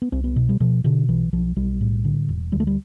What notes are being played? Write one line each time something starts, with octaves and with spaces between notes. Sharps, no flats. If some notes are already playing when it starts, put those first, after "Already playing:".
B3
C2 C4
B3
B2
G3
B2 F3
B2 D3
B1 E3
B1 F3
B1 G3
A2
D3
E1
D2 G3
A3
G3